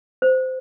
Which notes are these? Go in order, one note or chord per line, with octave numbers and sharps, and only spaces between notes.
C5